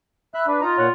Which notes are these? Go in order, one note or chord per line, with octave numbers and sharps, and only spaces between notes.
E5 B5 F#6
D4 B4
D#4 F4 A#5
A#2 C#5 F#5